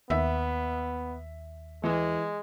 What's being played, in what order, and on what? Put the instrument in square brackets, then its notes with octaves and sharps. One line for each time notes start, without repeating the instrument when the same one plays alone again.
[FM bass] D#2 [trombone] B3 [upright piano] E5
[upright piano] E3 [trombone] G#3